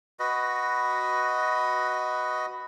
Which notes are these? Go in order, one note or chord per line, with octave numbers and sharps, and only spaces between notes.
F#4 B4 D#5